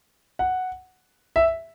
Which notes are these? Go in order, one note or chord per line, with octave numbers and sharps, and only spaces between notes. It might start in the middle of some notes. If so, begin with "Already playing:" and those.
F#5
E5